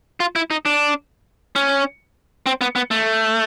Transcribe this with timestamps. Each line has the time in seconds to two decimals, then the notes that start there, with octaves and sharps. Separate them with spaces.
0.20 F4
0.36 E4
0.51 D#4
0.65 D4
1.56 C#4
2.46 C4
2.61 B3
2.76 B3
2.91 A3